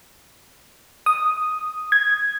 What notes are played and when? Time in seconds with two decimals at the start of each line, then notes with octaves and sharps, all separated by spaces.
1.06 D#6
1.92 G#6